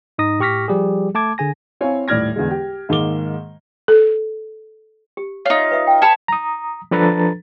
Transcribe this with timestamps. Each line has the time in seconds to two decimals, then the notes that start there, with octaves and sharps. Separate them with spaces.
0.18 G#2 D#4 D#6 A#6
0.40 A2 G4 C#6 F6 A#6 B6
0.68 F3 G3 G4 G#4
1.15 A3 A5 D6 G#6
1.38 D3 G#4 G#5 A#6
1.81 C4 E4 C#5 F5 G#5
2.08 D#1 A2 D5 F6 G#6 A#6
2.36 E2 D3 G#3
2.51 G4
2.89 G#2 D#3 G#3 A#3 D6 G7
3.88 A4
5.17 G4
5.46 D#4 F4 C#5 D#5
5.71 B4 E5 D#6
5.87 G5
6.02 C#5 A5 B5
6.28 A#5 D#6
6.91 F3 D4 A4 B4 A#5 A6